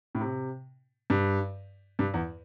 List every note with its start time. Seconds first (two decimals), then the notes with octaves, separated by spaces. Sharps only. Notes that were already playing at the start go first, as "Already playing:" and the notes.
0.15 A2
0.21 C3
1.10 G2
1.99 G2
2.14 E2